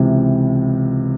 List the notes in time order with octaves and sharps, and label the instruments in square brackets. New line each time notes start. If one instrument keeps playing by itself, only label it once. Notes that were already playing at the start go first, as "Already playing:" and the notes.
Already playing: [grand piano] C#2 C3 E3